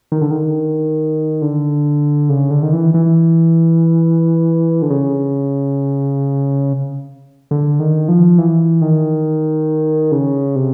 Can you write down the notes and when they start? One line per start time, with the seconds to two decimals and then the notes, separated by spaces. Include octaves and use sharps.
0.12 D#3
0.21 D3
0.31 D#3
1.42 D3
2.29 C#3
2.51 D3
2.62 D#3
2.73 E3
2.94 E3
4.82 D3
4.90 C#3
7.51 D3
7.80 D#3
8.08 F3
8.38 E3
8.81 D#3
10.12 C#3
10.56 C3